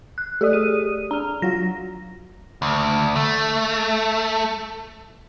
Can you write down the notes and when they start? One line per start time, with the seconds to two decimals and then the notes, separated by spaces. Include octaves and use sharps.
0.18 F#6
0.41 A3 G4 A4 D5 D#6
0.53 G#4 D#7
1.11 D4 A#5 F6
1.42 F#3 F4 F#4 A#6
2.62 D2
3.16 A3